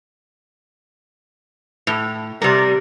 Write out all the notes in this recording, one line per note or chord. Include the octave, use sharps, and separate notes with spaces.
A2
C3 G3 A#4